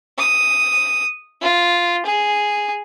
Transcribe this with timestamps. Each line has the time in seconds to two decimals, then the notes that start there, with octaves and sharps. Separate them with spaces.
0.18 D#6
1.42 F4
2.06 G#4